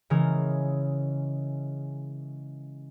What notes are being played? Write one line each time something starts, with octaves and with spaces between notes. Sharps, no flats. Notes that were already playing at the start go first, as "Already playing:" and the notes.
C#3 E3 G#3 A#4